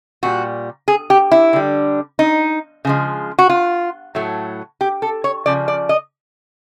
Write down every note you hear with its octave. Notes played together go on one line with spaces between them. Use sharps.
A#2 G3 F#4
G#4
G4
E4
D3 G3
D#4
C#3 F3 G#3
F#4
F4
A2 F#3 A3
G4
A4
C#5
C#3 F3 D5
D5
D#5